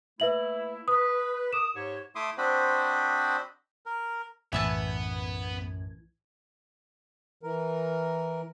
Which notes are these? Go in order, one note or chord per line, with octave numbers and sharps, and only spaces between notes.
A3 A#3 E4 B4 E5 F#7
B4 D#6
A#4 D6 D#6 E7
G#2 G4 C#5
A3 E4 E5 C6 D6 D#6
C4 D4 F#4 C5 D#5 B5
A#4
B1 F#2 A2 E3 B3 E5 A5 G#6
E3 A#4